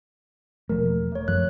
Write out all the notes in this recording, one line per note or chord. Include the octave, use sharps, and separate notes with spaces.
E1 F3 A3 A#4
A3 C#5
F#2 F3 F#6